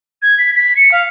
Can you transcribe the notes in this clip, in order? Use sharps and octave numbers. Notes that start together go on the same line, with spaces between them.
G#6
B6
B6
C#7
F5